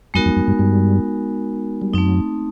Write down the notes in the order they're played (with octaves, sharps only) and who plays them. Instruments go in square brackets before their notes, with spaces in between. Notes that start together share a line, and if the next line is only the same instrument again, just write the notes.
[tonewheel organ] F#2 F#3 [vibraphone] G#3 B3 D#4 F#4 A#4
[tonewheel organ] F2 F3
F#2 F#3
G2 G3
G2 G3
G3
[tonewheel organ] F#2 F#3 [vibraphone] A3 C4 D#4